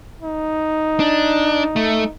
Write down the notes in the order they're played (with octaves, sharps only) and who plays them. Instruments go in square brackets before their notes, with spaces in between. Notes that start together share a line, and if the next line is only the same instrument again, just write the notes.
[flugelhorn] D#4
[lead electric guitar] D4
A3